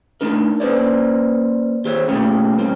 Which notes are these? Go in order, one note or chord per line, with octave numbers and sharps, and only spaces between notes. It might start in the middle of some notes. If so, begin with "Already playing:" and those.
A3 D4 D#4 A#4
A#3 C#4 B4 C5 D5
D#2 G4 C5 C#5
B2 A3 A#3 C#4 G4
G3 C4 C#4